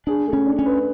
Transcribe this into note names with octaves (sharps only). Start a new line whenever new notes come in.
D4 G#4
A3
C#4
D4
C#4
B4